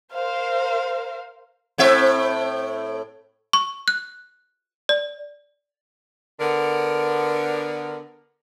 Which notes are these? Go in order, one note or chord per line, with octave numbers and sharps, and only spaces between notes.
A#4 C5 F5
A2 C4 E5
C#6
F#6
D5
D3 B3 A#4